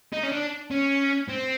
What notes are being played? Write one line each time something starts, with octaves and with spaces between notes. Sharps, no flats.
D#4
C#4
D4
C#4
C4